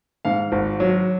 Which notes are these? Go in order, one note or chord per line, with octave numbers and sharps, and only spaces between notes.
G#2 F5
G#1
F#3